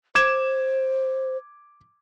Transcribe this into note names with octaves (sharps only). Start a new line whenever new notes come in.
C5 D6 G#6 E7